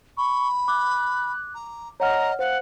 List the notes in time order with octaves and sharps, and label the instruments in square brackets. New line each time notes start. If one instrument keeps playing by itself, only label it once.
[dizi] B5 [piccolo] C#6
[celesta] D6 [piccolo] F#6
[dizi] A#5
[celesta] C#5 F#5 F6 [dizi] D#5 [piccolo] A#5
[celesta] C5 [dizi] F5 [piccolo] F#5